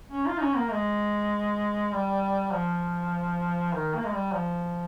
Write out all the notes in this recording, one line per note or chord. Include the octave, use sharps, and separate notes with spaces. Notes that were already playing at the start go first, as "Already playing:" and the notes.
C#4
F4
D#4
C#4
A#3
G#3
G3
F3
D#3
A#3
G#3
G3
F3